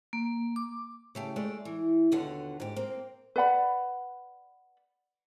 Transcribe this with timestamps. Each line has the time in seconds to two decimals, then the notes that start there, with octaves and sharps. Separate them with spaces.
0.13 A#3
0.56 D6
1.15 C#3 A3 G4
1.36 G#3 A3 D5
1.65 E3
2.12 D#2 B2 D3 F4 F#5
2.60 G#2 G4
2.76 A#3 C4
3.36 B4 D5 F#5 B5